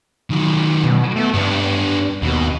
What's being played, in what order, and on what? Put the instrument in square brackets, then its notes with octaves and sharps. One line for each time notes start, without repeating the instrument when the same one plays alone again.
[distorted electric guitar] D#3 F#3
[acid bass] B2
[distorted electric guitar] B2 [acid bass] A3
[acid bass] G2 [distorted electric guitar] B3 D4
[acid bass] D#2 [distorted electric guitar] B2